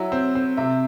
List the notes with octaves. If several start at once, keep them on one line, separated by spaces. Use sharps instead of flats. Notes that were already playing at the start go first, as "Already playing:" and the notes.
Already playing: F#3 E4
C4
C4
C3 E5